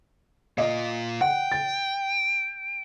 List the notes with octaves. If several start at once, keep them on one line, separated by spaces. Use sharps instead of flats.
A#2 F4 D#5
F#5 G5
A6